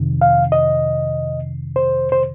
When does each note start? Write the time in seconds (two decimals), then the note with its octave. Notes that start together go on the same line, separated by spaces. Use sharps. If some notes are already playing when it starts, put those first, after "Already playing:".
Already playing: F2 C3 D#3
0.21 F5
0.52 D#5
1.76 C5
2.12 C5